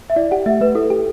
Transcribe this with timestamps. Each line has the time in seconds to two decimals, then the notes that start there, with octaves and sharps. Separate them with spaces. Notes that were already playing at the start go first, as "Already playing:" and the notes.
0.10 E5
0.16 E4 D5
0.31 G4 F#5
0.46 A3 E5
0.61 A3 B4
0.75 E4 A4
0.90 G4